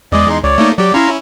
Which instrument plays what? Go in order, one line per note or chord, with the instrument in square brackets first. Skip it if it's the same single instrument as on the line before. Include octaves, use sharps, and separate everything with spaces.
[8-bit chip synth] E2 G#3 [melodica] D5 D#5
[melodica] D#4 C6
[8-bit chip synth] C#2 [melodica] C#5 D5
[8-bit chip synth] A3 A#3 D#4
[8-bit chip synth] F#3 G4 [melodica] D5
[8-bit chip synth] C#4 E4 [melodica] F5 A#5 C6